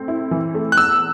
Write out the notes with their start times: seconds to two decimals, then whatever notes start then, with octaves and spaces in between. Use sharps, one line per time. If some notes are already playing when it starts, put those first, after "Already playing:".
Already playing: A3 C4
0.08 E4
0.31 E3
0.54 A3
0.72 F#6
0.77 E2 E6